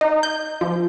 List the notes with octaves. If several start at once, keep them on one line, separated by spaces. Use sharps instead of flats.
D#4
G6
F3